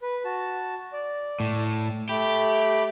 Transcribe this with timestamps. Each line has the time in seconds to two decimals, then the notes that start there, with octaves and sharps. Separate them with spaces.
0.02 B4
0.25 F#4 A5
0.93 D5
1.40 A2
2.09 A3 G4 B5 D6